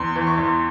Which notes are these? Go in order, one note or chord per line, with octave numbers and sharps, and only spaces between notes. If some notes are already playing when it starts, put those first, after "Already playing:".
Already playing: E2 C6
E3
C#6
E2